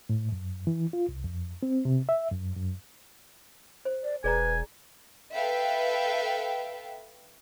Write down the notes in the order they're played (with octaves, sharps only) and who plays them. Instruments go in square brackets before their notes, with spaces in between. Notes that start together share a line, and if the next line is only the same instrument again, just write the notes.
[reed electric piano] A2
F#2
E3
F4
C2
F2
C4
C3
E5
F#2
F#2
[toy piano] C5
[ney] D5
[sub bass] E1 [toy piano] G#4 D5 A#5 [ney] B4 [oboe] G#5
[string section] A4 B4 E5 F5 G5